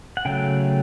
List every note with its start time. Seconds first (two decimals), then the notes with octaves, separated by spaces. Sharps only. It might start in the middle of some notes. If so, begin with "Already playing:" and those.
0.17 F#5
0.25 C#3 F#3 A3 G5